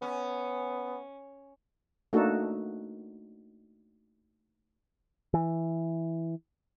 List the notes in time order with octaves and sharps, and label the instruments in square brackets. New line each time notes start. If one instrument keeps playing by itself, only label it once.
[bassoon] B3 [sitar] C#4
[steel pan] A3 A#3 D4 D#4 F#4 A4
[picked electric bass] E3